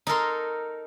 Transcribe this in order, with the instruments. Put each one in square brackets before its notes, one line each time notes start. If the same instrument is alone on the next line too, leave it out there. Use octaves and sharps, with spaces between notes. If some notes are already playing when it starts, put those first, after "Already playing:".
[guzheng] D#4 A4 A#4 C6